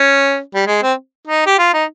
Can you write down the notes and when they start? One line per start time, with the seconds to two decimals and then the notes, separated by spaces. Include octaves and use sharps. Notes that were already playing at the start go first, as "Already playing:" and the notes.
Already playing: C#4
0.55 G3
0.67 G#3
0.82 C4
1.27 D#4
1.46 G4
1.58 F4
1.73 D#4